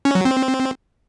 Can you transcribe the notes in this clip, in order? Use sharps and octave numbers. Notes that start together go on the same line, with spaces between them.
C#4
F#3
C4